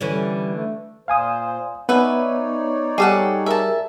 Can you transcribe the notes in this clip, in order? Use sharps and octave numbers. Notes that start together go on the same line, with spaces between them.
D3 E3 G3 C#4
A3
A#2 C5 F5 G#5 D#6
B3 D#4 B4 C#5 D5 E5 G#5
G3 G#4 A4 F#5
G#4 A#4 E5 A5